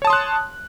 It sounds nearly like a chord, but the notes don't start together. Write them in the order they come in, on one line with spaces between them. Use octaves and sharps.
C#5 A5 D#6 C6 F#6